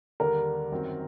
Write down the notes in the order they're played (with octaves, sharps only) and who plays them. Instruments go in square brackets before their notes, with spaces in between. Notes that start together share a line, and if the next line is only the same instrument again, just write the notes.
[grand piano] D#2 D3 G3 [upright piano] A#4
[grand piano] G1 F#2 D#3 F#3 C4